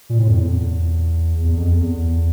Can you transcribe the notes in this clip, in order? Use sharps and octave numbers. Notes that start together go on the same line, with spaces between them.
A#2
A2
F2
E2
E2
F2
E2
E2